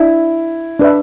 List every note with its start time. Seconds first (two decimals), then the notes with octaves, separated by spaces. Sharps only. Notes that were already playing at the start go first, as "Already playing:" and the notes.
Already playing: D4 E4
0.79 D4 B4 E5